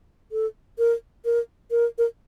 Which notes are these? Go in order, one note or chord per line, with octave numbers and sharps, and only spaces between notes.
A4
A#4
A#4
A#4
A#4